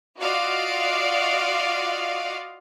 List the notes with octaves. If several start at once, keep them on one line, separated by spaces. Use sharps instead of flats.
F4 F#4 D5 D#5 F5